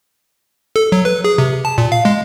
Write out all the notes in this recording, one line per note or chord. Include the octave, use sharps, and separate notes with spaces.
A4
F#3
B4
G#4
C3
A5
A#2
F5
G#3